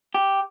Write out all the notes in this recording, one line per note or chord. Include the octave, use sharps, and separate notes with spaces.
G4